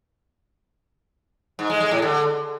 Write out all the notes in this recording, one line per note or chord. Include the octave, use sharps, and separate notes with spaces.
G#2
G#3
G#3
A2
D3